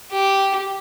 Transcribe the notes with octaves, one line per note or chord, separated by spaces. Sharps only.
G4